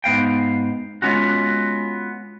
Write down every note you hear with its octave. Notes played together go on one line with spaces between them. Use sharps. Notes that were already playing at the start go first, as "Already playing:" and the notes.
G#2 B3 F5 G5
G#3 B3 C#4 F4 F#4